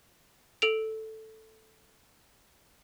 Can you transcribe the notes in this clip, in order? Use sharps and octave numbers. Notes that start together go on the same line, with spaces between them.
A4 D7 F7